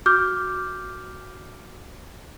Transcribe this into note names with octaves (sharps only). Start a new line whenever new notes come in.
F#4 D6 F6 G6